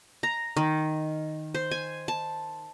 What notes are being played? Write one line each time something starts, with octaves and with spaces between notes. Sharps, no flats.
A#5
D#3
C5
G#5
A5